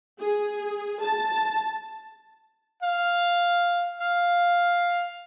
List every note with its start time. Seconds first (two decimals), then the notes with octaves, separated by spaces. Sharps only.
0.20 G#4
1.02 A5
2.83 F5
4.01 F5